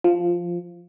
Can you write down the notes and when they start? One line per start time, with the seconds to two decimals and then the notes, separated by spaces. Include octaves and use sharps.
0.04 F3